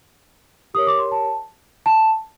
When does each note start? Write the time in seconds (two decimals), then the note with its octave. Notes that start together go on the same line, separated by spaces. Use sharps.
0.74 G4 A#4 C#5 D#6
0.87 D6
0.99 C6
1.12 A5
1.86 A5